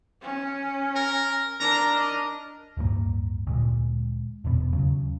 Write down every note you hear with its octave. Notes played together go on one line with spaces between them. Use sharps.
C#4
A#4
D4 A#4 A#5
D#5
D1 G2 G#3 A#3
D2 A#2 G#3
D#1 E2 B2 B3
D#2 C#3 F#3